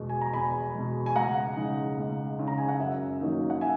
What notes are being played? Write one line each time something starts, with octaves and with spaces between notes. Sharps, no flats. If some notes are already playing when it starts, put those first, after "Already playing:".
Already playing: E2 B2 G#3
G#5
A#5
E2 G#5 B5
B2 G#3
G#5
C#2 F#5 A#5
C#3 G#3 D#4
C#2
C#3 G#3 D#4
A#5
G#5
F#5
F#2 E5
D#3 F#3 A#3 D#4
F#5
E5 G#5